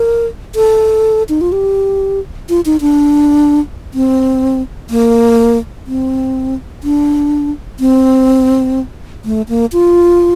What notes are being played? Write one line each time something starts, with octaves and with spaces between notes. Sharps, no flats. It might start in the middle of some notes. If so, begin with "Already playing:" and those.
Already playing: A#4
A4
D#4
F4
G4
F4
D#4
D4
C4
A#3
C4
D4
C4
A3
A#3
F4